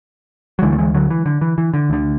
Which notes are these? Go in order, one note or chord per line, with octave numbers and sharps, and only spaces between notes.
F#3
D2 D3 E3 G#3
A3
E3 G#3
D3 F#3
E3
D3
E3
E3
D3
D2 D3